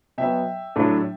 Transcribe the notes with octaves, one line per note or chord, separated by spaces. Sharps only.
B2 F#3 B3 E5 G5
A2 F#3 A3 D4